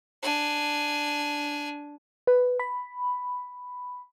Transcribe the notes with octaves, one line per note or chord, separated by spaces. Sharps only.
D4 G#5
B4
B5